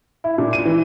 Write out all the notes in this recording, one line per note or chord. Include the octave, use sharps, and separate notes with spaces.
E4
A#2
D#7
E3